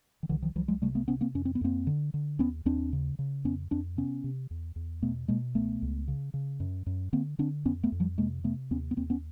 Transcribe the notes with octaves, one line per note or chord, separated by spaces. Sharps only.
D#3
C2 D3 E3
D#3 F3
C2 E3 F#3
F#3 G#3
C3 G3 A3
A3 B3
C3 B3 C#4
A#3 C4
F2 C#4
C4
B3
F2 A#3 C4
D3
D3
D#2 B3 C#4
D#2 C4 D4
C#3
C#3
F2 B3 C#4
F2 C4 D4
C3 B3 C#4
C3
E2
E2
B2 A3 B3
B2 G#3 A#3
C#2 A3 B3
C#2
C#3
C#3
F#2
F#2
D3 A#3 C4
D3 C4 D4
F2 B3 C#4
A3 B3
F2
F3 G3
C3 G#3 A#3
C3 A3 B3
D#2 B3 C#4
B3
D#2 A#3 C4
B3 C#4